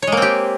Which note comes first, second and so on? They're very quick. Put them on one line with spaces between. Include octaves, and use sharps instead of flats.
C#5 G#3 A#3 C4 G4